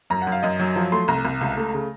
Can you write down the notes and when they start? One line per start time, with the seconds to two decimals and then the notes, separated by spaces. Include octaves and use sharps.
0.10 F#2 A#5
0.22 F#5
0.27 F#2
0.32 F5
0.43 F#2 D#5
0.59 F#3
0.76 F3
0.92 A3 C6
1.08 C2 A#5
1.25 C2
1.41 C#2
1.57 A3
1.74 C#3